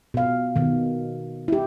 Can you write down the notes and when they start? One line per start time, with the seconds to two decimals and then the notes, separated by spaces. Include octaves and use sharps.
0.14 B2 F5
0.56 B2 D#3
1.48 E4 G4